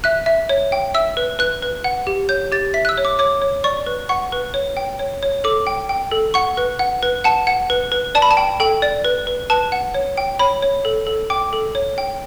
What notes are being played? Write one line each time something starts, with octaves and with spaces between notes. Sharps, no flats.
E5 F#6
E5
C#5
G5
E5 E6
B4
B4 F#6
B4
F#5
G4
C#5 G6
G4 A6
E5 B6
F#6
E6
C#5
D6
C#5 D6
C#5
D5 C#6
B4
F#5 C#6
B4
C#5
G5
C#5
C#5
A4 D6
G5
G5
A4
F#5 C#6
B4
F#5
B4
F#5 A5
F#5
B4
B4
D5 A5
B5
A5
G5
A4 G5
D5
B4
B4
B4 A5
F#5
C#5
G5
C#5 B5
C#5
A4
A4
G5 D6
A4
C#5
G5